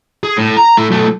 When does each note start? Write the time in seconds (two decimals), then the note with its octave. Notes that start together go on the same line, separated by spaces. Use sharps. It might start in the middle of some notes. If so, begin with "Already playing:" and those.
0.23 G#4
0.37 A2
0.57 A#5
0.77 A3 E4
0.91 B1 A3